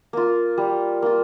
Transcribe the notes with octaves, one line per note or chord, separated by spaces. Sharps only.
A#3 F4
G3
A#3 F4